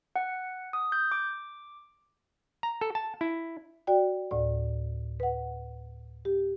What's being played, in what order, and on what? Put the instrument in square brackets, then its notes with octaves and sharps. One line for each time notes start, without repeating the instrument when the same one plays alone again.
[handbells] F#5
D#6
G6
D6
[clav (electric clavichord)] A#5
A4
A5
E4
[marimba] F#4 D5 G5
D2 A2 D5
B4 F#5
G4